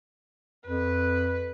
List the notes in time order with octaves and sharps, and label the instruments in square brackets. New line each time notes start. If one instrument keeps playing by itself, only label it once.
[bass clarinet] F2 [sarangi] B4